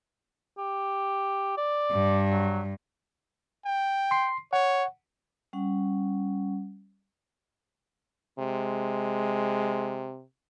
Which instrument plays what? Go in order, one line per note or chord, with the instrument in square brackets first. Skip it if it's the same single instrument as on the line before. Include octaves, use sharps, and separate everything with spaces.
[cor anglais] G4
D5
[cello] G2
[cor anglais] F#3
[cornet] G5
[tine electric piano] C6 C7
[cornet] C#5 [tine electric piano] F#5
[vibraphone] G3 C#4 F#5
[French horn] C3 [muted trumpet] G#3